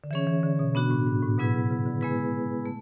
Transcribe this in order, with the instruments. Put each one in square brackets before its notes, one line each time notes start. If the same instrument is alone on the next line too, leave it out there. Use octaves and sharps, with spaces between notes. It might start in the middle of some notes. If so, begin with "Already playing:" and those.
[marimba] D3
[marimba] E3 [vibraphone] C#4 G#4 C#5 E5
[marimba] E3
D3
B2
[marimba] B2 [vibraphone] B3 D4 F#4
[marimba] A2
G#2
A2
[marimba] B2 [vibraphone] F#3 B3 E4 G#4 B4
[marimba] C#3
C#3
D3
[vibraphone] G#3 B3 E4 G#4 B4
A3